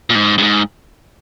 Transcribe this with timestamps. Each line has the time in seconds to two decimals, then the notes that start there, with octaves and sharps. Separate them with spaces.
0.10 A#2
0.15 G#2
0.38 G2
0.43 G#2